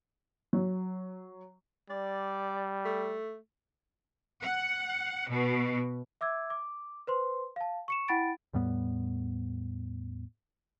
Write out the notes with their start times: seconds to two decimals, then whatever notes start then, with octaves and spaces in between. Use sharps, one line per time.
0.53 F#3
1.90 G3 D5
2.85 A3
4.43 F#5
5.29 B2
6.21 E5 D6 E6 G#6
6.50 D6
7.07 B4 C5 C6
7.56 F5 A5
7.88 C#6 C#7 E7
8.08 E4 F#5 G5 B5 A6 D7
8.53 E2 A2 G3 B3